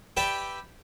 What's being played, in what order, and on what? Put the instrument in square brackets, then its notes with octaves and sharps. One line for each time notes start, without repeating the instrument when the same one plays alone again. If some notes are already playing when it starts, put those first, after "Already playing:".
[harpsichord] G4 B4 D5 E5 G5